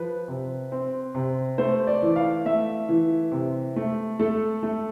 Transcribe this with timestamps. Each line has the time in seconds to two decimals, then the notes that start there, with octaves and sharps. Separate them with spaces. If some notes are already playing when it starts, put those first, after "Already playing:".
Already playing: F3 B4
0.28 C3
0.72 C4
1.15 C3
1.58 A3 C5
1.87 D5
2.02 E3
2.16 F5
2.46 A3 E5
2.89 E3
3.32 C3
3.76 A3
4.19 A3 A4
4.63 A3